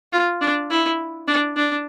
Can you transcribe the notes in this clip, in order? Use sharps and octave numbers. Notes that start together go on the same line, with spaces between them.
F4
D4
E4
D4
D4